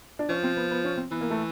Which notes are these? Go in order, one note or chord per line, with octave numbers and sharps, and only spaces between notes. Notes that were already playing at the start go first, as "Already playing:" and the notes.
D4
F3 C#4
C4
B3
B3
C#4
C4
E3 B3
A#3
A3